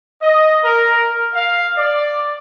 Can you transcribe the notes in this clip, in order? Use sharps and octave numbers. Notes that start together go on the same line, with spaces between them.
D#5
A#4
F5
D5